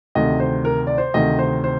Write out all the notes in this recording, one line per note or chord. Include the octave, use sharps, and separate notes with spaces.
D2 C3 D#3 D#5
C5
A#4
D5
C5
D2 C3 D#3 D#5
C5
C5